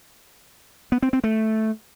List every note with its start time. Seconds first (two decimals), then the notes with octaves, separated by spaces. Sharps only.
0.92 B3
1.02 C4
1.13 C4
1.24 A3